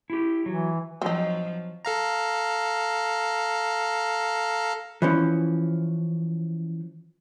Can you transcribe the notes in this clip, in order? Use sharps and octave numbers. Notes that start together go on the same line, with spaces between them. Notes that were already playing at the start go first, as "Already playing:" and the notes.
E4 G4
E3 F#3
F3 F#3 C4 D#4
A4 F5 A#5
E3 F3 C#4